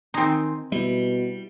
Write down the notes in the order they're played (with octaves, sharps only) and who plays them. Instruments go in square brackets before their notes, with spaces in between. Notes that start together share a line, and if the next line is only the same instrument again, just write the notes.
[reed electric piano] D#3 G#5 C6 [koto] C4 D#4
[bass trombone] B2 [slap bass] G3 [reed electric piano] E4